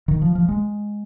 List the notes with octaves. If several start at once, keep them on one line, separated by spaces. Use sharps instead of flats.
D#3
F3
F3
G#3